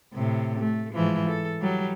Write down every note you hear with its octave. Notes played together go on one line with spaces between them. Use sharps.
A2 C3
A3
G#2 E3 F3
A4
F#3 G3